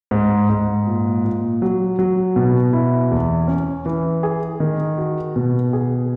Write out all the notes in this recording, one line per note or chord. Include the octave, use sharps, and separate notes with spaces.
G#2
G#2
A#2
A#2
F#3
F#3
B2
E4
E2
C#4
E3
G#4
D#3
F#4
B2
G#4